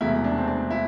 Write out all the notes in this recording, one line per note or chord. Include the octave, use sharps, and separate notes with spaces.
E1 E2 C3 A3 E4
D4
C4
D4
E4